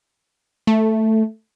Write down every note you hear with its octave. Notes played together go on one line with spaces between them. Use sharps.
A3